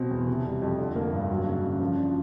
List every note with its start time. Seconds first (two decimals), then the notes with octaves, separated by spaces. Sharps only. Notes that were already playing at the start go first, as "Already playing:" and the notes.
Already playing: B2 C4
0.11 E2
0.28 C3
0.45 G3
0.62 F2
0.79 D3
0.96 A#3
1.13 G2
1.30 F#3
1.46 C#3
1.63 C#3
1.81 F3
1.97 D4